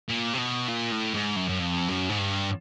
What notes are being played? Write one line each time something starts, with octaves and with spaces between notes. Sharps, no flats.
A#2
C3
B2
A#2
A2
G#2
F#2
F#2
F2
F#2
G#2
G2